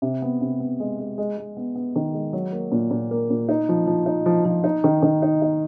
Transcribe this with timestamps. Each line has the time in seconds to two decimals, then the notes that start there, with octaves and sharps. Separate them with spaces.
0.02 C3
0.22 B3
0.41 C3
0.60 B3
0.80 G#3
0.99 G#3
1.18 G#3
1.37 G#3
1.57 B3
1.75 B3
1.96 D#3
2.14 G#3
2.33 F#3
2.52 A#3
2.72 A#2
2.91 A#2
3.11 A#3
3.30 A#2
3.49 D#4
3.69 F3
3.87 F3
4.06 D#4
4.26 F3
4.45 F3
4.64 D#4
4.84 D#3
5.02 D#3
5.22 D#4
5.42 D#4